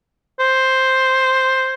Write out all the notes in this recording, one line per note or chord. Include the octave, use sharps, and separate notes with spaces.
C5